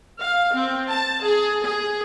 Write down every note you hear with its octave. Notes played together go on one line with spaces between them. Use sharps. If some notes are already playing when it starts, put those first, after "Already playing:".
F5
C4
A5
G#4
G#4